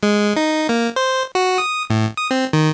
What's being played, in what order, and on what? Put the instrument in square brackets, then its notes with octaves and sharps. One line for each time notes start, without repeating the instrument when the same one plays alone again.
[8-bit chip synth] G#3
D#4
A#3
C5
F#4
D#6
A2
D#6
C4
D#3